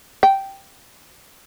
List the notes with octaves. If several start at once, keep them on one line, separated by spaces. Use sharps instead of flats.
G5